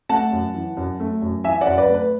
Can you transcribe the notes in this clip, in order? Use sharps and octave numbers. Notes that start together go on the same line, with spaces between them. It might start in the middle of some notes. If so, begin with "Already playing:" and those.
A3 F#5 A5
F#2
E3
F#2
A3
F#2
E3 E5 G#5
D5 F#5
F#2
B4 D5
A3
B4